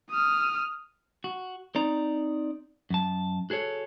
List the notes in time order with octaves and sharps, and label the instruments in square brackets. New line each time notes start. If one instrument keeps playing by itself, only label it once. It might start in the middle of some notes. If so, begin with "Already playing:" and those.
[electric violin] D#6 F6
[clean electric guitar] F#4
C4 D#4 D5 A#5
F#2 A5
F#4 G#4 A4 C#5